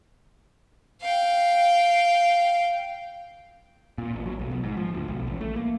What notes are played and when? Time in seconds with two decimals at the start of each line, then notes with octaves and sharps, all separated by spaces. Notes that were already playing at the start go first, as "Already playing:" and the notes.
1.01 F5 G5
3.98 A#2
4.14 A1
4.26 F#3
4.39 B1
4.51 B2
4.63 G#2
4.77 F3
4.94 D2
5.08 B1
5.27 A1
5.41 A3
5.56 A#3